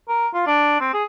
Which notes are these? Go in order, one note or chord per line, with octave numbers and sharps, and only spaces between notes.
A#4
F4
D4
C4
G#4